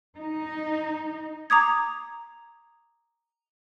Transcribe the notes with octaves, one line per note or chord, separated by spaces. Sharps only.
D#4
A#5 D6 D#6 G#6